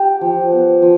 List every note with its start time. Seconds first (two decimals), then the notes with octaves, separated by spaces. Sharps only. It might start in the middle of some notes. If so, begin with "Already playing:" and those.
Already playing: G4
0.21 F3
0.52 B3
0.82 F3